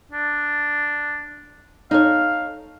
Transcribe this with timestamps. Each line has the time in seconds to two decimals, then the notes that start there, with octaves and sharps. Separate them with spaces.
0.11 D4
1.91 D#4 A4 C#5 F5